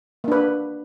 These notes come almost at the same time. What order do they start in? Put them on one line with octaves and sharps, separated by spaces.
A#3 D4 B4